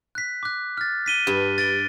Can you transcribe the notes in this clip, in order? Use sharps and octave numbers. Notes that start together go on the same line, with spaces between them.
F#6 B6
D6 F#6
F6 A6
B6 D#7 G7
G2 B6
A6 D7 G7